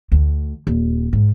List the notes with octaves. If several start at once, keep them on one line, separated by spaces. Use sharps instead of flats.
D2
D#1
G#2